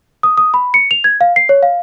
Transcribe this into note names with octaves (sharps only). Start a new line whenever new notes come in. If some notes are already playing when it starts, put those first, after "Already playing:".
D#6
D#6
B5
C#7
F7
G#6
F5
C7
C#5
F5